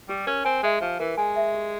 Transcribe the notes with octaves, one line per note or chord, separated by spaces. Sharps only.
G3 G4
C#4 A#4
C4 G#5
G#3 E5
F3 G4
E3 A#4
G#3 G#5
E5
G4